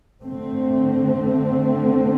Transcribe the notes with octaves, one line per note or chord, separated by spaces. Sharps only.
D3 A3 C4